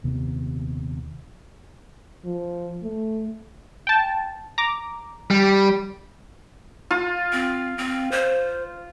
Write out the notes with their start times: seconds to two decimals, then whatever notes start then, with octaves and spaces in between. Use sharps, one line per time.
0.03 D#1 D#2 C3 B3
2.25 F3
2.83 A3
3.87 G5 A5
4.58 A#5 D6
5.31 G3
6.91 F4
7.32 C4
7.78 C4
8.12 C5